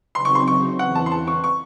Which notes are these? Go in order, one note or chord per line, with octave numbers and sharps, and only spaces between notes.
C#3 F#3 C4 D#4 C6
C#6
C6
C#6
E2 C#3 E3 C4 F#5
A5
C6
A5
C#6
C#6